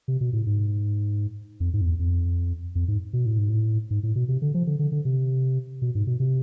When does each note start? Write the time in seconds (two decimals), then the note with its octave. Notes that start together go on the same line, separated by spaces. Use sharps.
0.08 C3
0.21 B2
0.33 A2
0.46 G#2
1.60 F2
1.73 G#2
1.81 F2
1.86 E2
1.99 F2
2.75 F2
2.88 G#2
3.13 B2
3.26 A2
3.38 G#2
3.50 A2
3.91 G#2
4.03 A2
4.16 B2
4.28 C3
4.42 D3
4.54 F3
4.67 D3
4.79 D3
4.92 D3
5.05 C3
5.82 B2
5.95 G#2
6.07 B2
6.20 C3